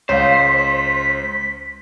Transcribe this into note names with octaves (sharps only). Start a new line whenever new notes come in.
C#2 C5 C#5 F5 B6